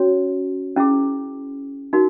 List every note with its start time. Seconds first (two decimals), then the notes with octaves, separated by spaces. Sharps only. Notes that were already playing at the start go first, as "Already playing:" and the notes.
Already playing: C#4 F#4 C#5
0.76 C#4 E4 G#4
1.93 D#4 F#4 A#4